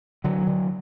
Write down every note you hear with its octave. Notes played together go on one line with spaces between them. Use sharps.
D3 F#3
D3